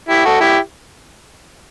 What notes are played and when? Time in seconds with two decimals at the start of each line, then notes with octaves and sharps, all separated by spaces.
0.09 E4 G4
0.25 F#4 A4
0.41 E4 G4